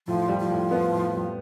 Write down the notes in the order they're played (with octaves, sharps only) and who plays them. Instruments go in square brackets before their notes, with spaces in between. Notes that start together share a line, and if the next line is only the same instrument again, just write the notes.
[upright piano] A2 [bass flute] F3
[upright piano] G3
[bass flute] F3
[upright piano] A2
B3
A2
G3